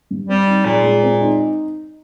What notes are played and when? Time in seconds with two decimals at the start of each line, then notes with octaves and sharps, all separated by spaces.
0.11 G2
0.29 G3 C4
0.47 D#4
0.65 A#2 G#4
0.84 G#3
1.03 C4
1.21 D#4